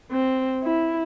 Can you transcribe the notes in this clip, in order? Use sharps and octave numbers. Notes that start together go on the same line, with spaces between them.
C4
E4